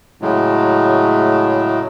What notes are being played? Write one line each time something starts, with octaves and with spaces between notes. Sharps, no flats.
A2 C#3 F#3 G#3 A3